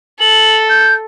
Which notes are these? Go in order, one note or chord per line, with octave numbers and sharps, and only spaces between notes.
A4 F#7
G6